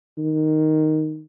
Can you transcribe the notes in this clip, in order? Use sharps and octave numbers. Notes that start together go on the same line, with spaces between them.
D#3